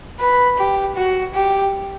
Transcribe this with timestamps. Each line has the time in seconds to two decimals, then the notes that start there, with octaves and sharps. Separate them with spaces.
0.20 B4
0.58 G4
0.96 F#4
1.34 G4